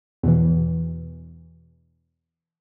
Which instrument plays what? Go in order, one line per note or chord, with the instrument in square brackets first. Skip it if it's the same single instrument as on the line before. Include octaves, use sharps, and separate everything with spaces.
[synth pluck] E2 B2 E3